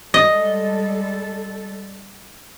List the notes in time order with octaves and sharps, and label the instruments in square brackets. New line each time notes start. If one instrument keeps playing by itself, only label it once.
[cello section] G3 G#3 A4 [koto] D#5